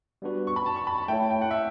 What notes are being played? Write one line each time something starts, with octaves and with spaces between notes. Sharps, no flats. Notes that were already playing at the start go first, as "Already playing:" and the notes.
G3 B3 D4 F#4 B4
C#6
B5
A5
C#6
B5
A5
A3 E4 A4 C#5 G5
G5
F#5
E5